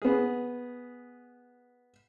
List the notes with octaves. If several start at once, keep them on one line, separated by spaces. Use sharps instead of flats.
B3 G#4